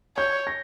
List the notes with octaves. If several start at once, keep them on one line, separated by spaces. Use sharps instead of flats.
C#5 G6
A#6